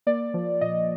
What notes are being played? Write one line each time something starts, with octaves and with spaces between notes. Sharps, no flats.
A#3 D5
F3
A#2 D#5